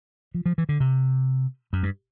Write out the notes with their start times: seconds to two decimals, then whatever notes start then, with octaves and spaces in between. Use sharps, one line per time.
0.34 F3
0.46 F3
0.58 E3
0.69 D3
0.80 C3
1.73 F#2
1.83 G2